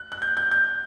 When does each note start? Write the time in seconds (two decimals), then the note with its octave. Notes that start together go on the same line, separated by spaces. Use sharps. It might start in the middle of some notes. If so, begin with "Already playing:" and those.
Already playing: F#6
0.12 F#6
0.22 G6
0.37 G6
0.51 G6